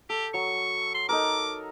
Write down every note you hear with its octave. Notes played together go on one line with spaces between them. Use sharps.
G4 A4
F#3 C#6
C6
D#4 A4 A#4 D6